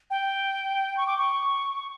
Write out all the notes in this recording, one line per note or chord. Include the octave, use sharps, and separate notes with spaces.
G5
C#6
D6
C#6